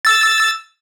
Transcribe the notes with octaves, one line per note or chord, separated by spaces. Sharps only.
E6 A6